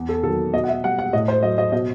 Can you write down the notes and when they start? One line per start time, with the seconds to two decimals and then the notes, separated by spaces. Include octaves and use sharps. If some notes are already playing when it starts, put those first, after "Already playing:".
Already playing: E2
0.09 A4
0.23 D#3 A4
0.27 F#3
0.53 B2 D#5
0.64 F#5
0.68 E5
0.84 G3 F#5
0.99 F#5
1.13 A2 D#5
1.28 C5
1.42 F#3 D#5
1.58 D#5
1.72 B2 D#5